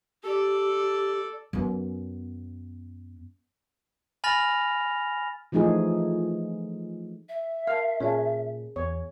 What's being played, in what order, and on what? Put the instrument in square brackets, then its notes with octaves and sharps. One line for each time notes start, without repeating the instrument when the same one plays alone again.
[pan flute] G4 [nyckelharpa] A4 D5
[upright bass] F#2 B3
[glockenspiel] G#5 B5 F6 A6 A#6 F7
[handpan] E3 F3 A3 D#4 G#4
[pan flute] E5
[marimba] A#4 A5 [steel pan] F5
[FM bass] A#2 [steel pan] C#4 [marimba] G#4 D5 A5
[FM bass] E2 [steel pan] C#5